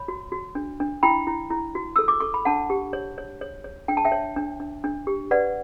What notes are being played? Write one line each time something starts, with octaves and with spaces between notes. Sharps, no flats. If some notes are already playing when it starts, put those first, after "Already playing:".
Already playing: C#5 B5
F#4
F#4
D4
D4
E4 G5 B5
E4
E4
F#4
A4 E6
D6
A4 C#6
B5
D4 F#5 A5
G4
C#5
C#5
C#5
C#5
D4 G5
A5
E5 G5
C#5
D4
D4
D4
G4
B4 D5 F#5